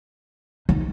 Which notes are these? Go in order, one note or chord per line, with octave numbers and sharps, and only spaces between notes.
D#4